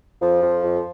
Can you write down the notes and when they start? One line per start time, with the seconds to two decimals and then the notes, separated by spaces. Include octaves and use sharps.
0.22 F2 F3
0.42 F2
0.64 F2